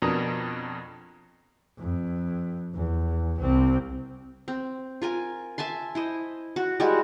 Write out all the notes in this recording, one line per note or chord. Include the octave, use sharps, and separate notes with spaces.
F2 B2 D4 A#4 A#5 D#6
F2
E2
C2 C4
C4
F4 A#4 G#5
E5 G#5 A5 C6
E4 C5 D#5
F#4
G3 G#3 E4 F#4